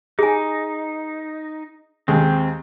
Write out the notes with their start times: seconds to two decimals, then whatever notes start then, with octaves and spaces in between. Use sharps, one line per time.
0.19 D#4 G#4 G#5
2.08 D#2 G#3 C4